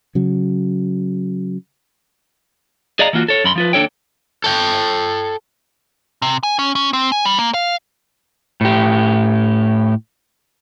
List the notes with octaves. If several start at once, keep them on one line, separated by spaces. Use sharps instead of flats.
C#3 F#3
G#4 D5 D#5 F5 A#5
E3 A#3 F4 F#4
A4 C#5
F#2 B5 C6
F3 F4 B4
D#2 D4 A4 C#5 G5
A4 G5
C3
G#5
C#4
C#4
C4
G#5
G3
A#3
F5
A2 G4